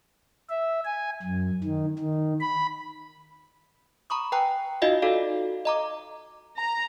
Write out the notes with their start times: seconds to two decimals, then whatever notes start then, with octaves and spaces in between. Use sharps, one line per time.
0.50 E5
0.85 G#5
1.23 F#2
1.64 D#3
1.99 D#3
2.40 B5
4.10 A#5 B5 C#6 D#6
4.32 B4 G5 G#5 A#5 F#6
4.82 D#4 F4 F#4 D#5 F5
5.02 D#4 F#4 A4 D5 F5
5.65 D#5 A#5 D6
6.59 A#5